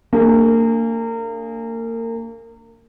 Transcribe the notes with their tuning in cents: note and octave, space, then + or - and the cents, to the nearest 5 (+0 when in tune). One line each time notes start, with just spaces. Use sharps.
A#3 -30 D4 +0 G#4 +0